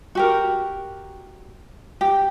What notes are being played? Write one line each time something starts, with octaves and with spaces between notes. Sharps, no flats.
F#4 G4 A#4
G4